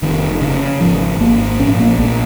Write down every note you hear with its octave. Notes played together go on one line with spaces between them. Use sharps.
F1 D#3
C#3
G#1 F3
G#1 A#3
A#1 C#4
A#3
A#1 A#3